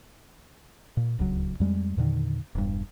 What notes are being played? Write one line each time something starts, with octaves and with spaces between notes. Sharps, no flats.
A#2
D1 C#2 F#3
F2 G3 G#3
E2 A#2 D3 D#3
E1 G2